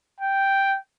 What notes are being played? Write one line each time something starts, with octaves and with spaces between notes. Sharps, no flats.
G5